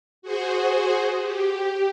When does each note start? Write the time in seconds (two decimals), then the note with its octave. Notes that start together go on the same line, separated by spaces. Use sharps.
0.22 F#4 G#4 C5
1.22 G4